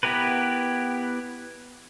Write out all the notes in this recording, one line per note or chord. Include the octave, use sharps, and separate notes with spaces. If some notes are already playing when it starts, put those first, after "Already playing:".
B3 E4 G4 A#4 B4